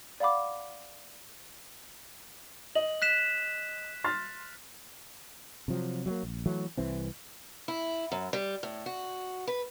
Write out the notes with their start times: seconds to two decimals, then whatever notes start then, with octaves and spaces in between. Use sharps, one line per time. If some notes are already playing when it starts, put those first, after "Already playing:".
0.20 D5 F5 F#5 B5 D6
2.75 D#5 F#7
3.02 F#6 B6 E7
4.04 C6 F6 A6
5.68 C3 F3 F#3
6.06 F#3 G#3 A#3
6.23 A#1
6.46 E3 F#3 A3
6.77 C2 E3 C4
7.68 E4
8.12 F#2
8.33 G3
8.63 A2
8.86 F#4
9.47 B4